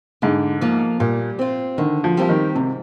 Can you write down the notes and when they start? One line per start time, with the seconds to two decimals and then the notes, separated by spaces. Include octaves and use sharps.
0.22 G#2 D3
0.61 F3 A#3
1.00 A#2 G3
1.39 C4 F4
1.78 D3 D#3
2.04 F3
2.17 F3 G3 C4 G4 A#4
2.29 D#3
2.55 G#2 C3